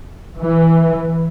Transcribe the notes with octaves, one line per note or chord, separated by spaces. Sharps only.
E3